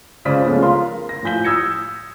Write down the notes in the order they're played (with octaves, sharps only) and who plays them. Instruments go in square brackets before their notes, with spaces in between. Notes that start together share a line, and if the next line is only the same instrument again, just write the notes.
[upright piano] C#2 C#3 C5 D5 B6
F3 G#3 A3 B3 C#4 F4
A#4 F5 C6
A#6
A2 F3 G#5 G6 B6 G7
D#6 E6 G6 G#6 A#6 C#7